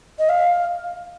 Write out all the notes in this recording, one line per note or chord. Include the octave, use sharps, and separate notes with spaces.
D#5
F5